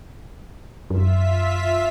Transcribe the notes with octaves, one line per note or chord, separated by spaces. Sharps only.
F#2 F4 E5 B6